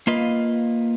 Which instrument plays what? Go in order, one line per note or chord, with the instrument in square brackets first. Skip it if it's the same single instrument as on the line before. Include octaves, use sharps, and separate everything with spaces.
[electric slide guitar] A#3 F4 B4 D#5